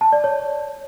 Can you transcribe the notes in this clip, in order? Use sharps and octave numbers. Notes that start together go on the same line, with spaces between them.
A5
D5
C#5